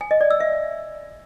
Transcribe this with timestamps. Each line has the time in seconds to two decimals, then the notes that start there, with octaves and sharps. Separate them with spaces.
0.01 G#5
0.11 D#5
0.21 D5
0.31 E6
0.40 E5